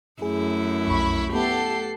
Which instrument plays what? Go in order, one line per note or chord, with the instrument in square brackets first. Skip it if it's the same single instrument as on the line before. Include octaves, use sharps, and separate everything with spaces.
[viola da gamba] F#2 A3 E4 [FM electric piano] G#4
[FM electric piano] B1 F2 [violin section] B5 C#6
[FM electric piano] A3 B3 E4 [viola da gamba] G4 [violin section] A4 F#5 C7